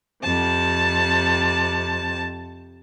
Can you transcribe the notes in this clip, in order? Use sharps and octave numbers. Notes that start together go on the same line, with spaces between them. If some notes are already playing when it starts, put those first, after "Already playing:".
F2 C3 A5